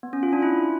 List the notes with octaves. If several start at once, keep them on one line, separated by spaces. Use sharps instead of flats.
B3
C#4
F4
D4
E4